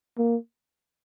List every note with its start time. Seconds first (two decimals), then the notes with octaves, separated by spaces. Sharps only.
0.18 A#3